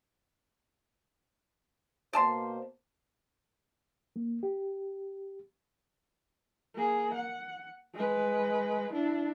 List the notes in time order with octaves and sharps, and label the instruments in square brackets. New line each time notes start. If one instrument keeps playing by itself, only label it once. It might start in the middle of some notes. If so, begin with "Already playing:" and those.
[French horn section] B2 A#3 C5 [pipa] D5 A5 C6
[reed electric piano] A#3
G4
[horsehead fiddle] A#3 G#4
F#5
G#3 B4
D4 E4